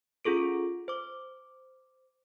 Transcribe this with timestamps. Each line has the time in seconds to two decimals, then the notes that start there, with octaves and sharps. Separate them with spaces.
0.25 C#4 F4 G#4 A4 D7
0.88 C5 D6